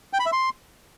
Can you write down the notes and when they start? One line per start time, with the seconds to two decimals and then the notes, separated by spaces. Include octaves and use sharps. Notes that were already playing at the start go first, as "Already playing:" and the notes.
0.13 G5
0.20 B5
0.26 E5
0.32 C6